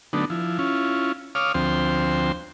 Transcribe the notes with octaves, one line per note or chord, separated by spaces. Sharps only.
D3 F#3 A3 B3 D4 D#4
F3 E4
C#4 E4 F4
C#5 F5 D6 D#6 F6
D2 F3 C4 C5 G5